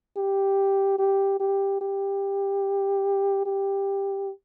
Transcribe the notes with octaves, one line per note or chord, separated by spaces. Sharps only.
G4
G4
G4
G4
G4